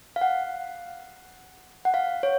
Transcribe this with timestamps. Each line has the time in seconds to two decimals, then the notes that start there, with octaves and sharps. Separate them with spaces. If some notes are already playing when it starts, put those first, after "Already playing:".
0.16 F5
0.21 F#5
1.85 F#5
1.94 F5
2.23 C#5